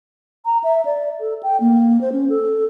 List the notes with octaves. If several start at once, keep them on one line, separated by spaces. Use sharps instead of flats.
A#5
E5
D5
A4
G5
A#3
C5
C#4
A4